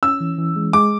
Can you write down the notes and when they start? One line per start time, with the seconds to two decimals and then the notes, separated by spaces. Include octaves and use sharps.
0.03 C#4 E6
0.20 E3
0.38 E3
0.56 G#3
0.73 G#3 D6